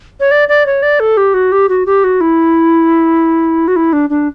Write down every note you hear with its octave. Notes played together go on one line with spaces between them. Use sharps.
C#5
D5
D5
C#5
D5
A4
G4
F#4
G4
F#4
G4
F#4
E4
F#4
E4
D4
D4